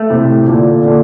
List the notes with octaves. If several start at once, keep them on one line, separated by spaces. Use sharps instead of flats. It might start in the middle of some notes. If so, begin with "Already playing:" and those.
Already playing: A3
A2 C3
A#2 D3
A#2 D3